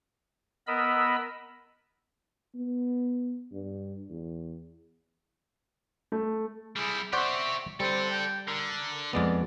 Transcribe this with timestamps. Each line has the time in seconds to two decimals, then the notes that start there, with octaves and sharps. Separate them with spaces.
0.67 B3 A#4 D#5 B5 E6
2.55 B3
3.52 G2
4.10 E2
6.12 A3
6.76 G3 E4 G#4
7.13 G4 C5 D5 E5 F#5 C#6
7.80 G3 C4 A4 D5
8.11 G5
8.48 D3 A#4
9.13 F2 G#3 B3 D5